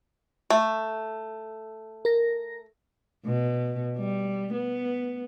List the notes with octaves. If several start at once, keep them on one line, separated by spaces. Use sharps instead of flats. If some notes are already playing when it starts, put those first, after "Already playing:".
A3
A#4 A#6
B2
G3
B3